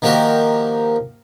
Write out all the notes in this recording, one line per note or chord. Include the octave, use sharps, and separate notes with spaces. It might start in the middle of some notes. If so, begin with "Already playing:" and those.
D#3 F3 A#3 F#4 G4 A#4